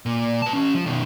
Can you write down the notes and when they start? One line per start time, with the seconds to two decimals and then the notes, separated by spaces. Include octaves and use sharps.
0.06 A#2
0.42 B4 A5
0.53 E3 C#4
0.75 F3
0.86 B2 D#3